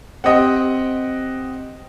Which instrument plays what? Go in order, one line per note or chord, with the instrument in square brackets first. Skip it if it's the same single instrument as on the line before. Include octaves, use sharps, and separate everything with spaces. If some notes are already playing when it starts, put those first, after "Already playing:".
[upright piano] C4 G4 [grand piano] D#5 F#5